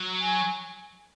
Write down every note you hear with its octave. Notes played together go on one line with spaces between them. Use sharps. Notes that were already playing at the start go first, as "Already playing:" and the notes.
Already playing: F#3
G#5